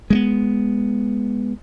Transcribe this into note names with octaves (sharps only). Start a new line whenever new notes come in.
G#3 A3 B3